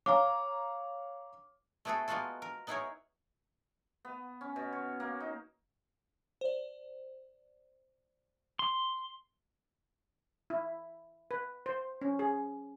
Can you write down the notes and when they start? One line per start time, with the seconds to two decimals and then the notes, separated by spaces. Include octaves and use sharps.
0.06 C#5 F5 A#5 D6
1.85 A3 B3 E4 F#4 G#4 A4
2.08 G#3 A#3 B3 F4 F#4 A4
2.42 A#4
2.67 B3 D#4 E4 G#4 A#4 C#5
4.05 B3
4.41 C#4
4.56 B2
4.72 C#5
5.00 A#3
5.20 D#4
6.41 C5 D5
8.59 C6
10.50 E4
11.31 B4
11.66 C5
12.01 C#4
12.19 G#4